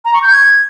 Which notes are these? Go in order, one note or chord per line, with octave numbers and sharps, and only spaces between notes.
A#5
C#6
G6
G#6